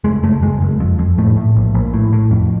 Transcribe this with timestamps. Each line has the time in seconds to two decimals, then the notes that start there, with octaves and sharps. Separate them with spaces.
0.04 F#1 G#3
0.23 F#1 A3
0.42 F#1 G#3
0.61 F#1
0.80 F2
0.99 F2
1.18 A2 A3
1.37 A2
1.56 A#1
1.74 A#1
1.94 A2
2.13 A2
2.31 F2